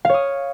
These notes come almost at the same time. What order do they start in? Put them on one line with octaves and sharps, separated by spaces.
F5 C#5 D#6